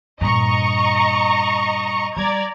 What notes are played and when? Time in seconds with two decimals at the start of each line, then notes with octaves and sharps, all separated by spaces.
0.21 G2 A#2 D#5 A#5 C#6
2.17 G3 D5 A#5 G#6